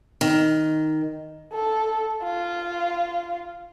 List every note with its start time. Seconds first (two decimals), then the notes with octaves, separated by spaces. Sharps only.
0.21 D#3
1.53 A4
2.24 F4